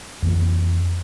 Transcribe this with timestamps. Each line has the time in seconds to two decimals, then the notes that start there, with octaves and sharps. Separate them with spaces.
0.22 F2 E3 A#3